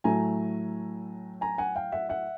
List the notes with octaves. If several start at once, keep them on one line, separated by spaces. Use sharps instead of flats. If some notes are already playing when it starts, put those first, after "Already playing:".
A2 F#3 A3 G#5 A#5
G#5 A#5
F#5 G#5
F5 G5
E5 F#5
E5 F#5